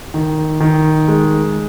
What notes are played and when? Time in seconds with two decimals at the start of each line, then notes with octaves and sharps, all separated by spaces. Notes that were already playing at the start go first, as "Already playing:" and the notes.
0.14 D#3
0.60 D#3
1.08 G#3